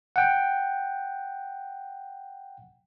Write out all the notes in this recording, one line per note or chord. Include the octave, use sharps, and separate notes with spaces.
F#5 G5